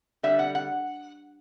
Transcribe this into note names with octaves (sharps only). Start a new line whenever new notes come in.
D3 G3 E5
F#5
F#5